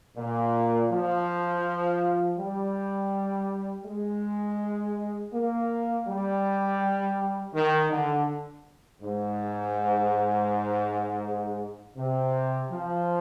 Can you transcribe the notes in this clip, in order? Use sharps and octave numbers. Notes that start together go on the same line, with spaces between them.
A#2
F3
G3
G#3
A#3
G3
D#3
D3
G#2
C3
F3